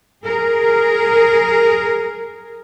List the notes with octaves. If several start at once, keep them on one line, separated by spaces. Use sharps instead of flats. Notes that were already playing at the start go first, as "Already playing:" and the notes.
G#4 A#4